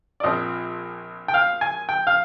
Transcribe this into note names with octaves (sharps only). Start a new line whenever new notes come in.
D5
A#1 A#2 F3 C4 D#5
G5
F5
G#5
G5
F5